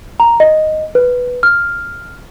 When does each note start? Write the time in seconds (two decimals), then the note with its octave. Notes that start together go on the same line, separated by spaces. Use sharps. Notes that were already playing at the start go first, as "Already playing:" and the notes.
0.20 A#5
0.40 D#5
0.95 B4
1.43 F6